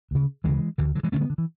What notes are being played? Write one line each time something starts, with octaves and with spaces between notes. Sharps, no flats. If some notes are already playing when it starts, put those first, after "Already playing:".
D2 C#3
D2 C#3 E3 G#3
D2 D3 E3
D3 F#3
E3 G#3
D2 D3 A3 C#4
G#3 B3
D3
E3